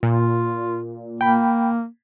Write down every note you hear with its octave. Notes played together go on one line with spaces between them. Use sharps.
A#2 F4
A#3 G5 B5